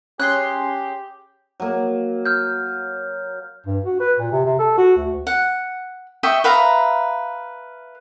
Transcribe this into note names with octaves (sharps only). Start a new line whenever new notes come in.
C#4 G4 G#4 C6 F#6
F#3 A#3
F6 G6
G2
F#4
B4
A#2
C3
C3
A4
F#4
D2
F#5
D#5 E5 G5 C#6
B4 E5 F5 A#5